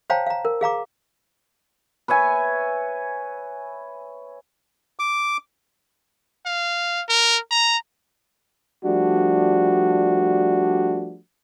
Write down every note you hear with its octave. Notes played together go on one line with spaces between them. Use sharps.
C5 C#5 F5 G5 A5 A#5
F5 A#5
A#4
G#4 F5 A#5 D6
B4 C#5 E5 G#5
D6
F5
A#4
A#5
F3 G3 A3 D4 F#4